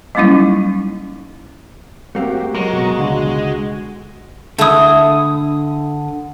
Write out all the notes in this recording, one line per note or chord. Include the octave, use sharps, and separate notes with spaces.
F#3 G3 A#3 C#4 D#4 E4
A3 A#3 C4 F#4 G4
F#3 G#3 A#4 A#5 C#6
B2 F#4
C#2 D3 F#4
D3 A3 E4 D#6